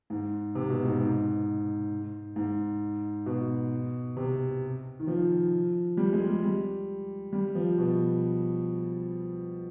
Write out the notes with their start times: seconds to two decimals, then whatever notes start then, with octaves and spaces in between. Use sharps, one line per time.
0.10 G#2
0.55 C3
0.70 B2
0.85 G#2
1.01 G#2
2.36 G#2
3.26 B2
4.17 C3
4.99 D#3
5.07 F3
5.97 G3
6.13 G#3
6.28 G3
6.43 G3
7.33 G3
7.55 F3
7.78 B2